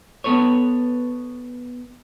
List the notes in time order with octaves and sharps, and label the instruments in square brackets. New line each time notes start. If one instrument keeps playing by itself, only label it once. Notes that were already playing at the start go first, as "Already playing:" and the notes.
[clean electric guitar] B3 A4 B4 C#5